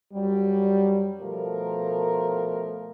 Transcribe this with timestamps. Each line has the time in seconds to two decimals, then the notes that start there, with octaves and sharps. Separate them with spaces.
0.13 F#2 F#3 G3
1.21 B2 F3 A3 A#4